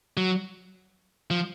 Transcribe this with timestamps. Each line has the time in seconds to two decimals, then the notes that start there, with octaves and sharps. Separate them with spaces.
0.17 F#3
1.30 F3